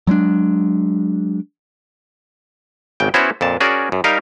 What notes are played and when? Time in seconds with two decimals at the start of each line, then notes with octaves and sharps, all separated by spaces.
0.07 F#3 G#3 C4 D4
3.00 G#1 C#3 G5
3.14 B3 C#4 E4 F#4 C5 C#5
3.41 F2 A#2 A5
3.60 C#4 F#4 G#4 A#4 D5
3.92 F#2
4.04 G3 D#4 G4 A#4 F5